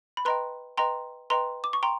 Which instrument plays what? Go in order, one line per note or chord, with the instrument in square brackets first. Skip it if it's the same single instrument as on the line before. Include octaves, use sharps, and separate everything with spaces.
[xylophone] B5
B4 D#5 G5 A#5 C6
B4 D#5 G5 A#5 C6
B4 D#5 G5 A#5 C6
D6
C#6
G5 A#5 C6